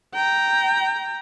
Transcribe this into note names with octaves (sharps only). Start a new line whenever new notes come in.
G5 A#5